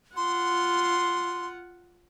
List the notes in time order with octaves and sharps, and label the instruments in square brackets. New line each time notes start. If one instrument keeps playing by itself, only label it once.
[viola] F4 F#5 [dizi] C6